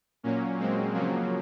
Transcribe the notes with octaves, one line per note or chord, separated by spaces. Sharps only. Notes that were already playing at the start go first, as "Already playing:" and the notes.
A#2 F#3 A#3 C#4
G#3 C4
C#3 F3 F#3 A#3